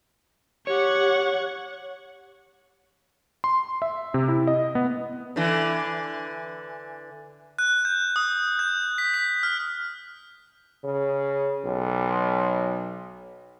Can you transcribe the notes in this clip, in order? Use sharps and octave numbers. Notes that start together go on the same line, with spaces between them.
G4 C#5 F#5 C#6
C6
E5
C3
E4
D#5
B3
D3 E3
F#6
G6
D#6
G6
B6
B6
F6
C#3
B1